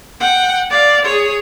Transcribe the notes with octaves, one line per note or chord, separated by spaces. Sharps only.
F#5 G5
D5 F5
G#4 C#5